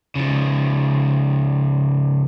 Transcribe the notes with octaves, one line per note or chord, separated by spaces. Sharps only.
C#3 F3